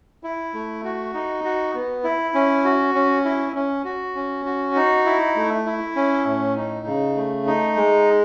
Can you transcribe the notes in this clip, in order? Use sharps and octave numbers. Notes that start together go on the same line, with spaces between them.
E4
A3
F#4
D#4
F#4
B3
E4
C#4
F#4
C#4
E4
C#4
F#4
C#4
F#4
D#4
E4
A3
E4
C#4
A2
D#4
C#3
A3
D#4
G#3